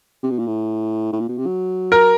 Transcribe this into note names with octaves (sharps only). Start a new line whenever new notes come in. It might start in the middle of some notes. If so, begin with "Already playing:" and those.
C3
B2
A#2
A2
A2
A#2
B2
C3
F#3
A#4